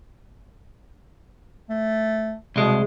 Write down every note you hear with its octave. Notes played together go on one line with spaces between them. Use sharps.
A3
C2 B2 G#3